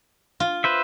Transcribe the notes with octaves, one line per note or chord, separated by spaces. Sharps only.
F4
B4 C5 E5